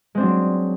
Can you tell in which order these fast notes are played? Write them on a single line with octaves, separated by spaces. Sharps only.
G#3 C4 D4 F#3